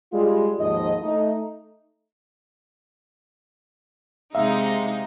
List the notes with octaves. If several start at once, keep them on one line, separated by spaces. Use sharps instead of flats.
G3 G#3 F4
D#2 G#2 F3 D#5
A3 D#4
C3 G#3 D#4 E5 F5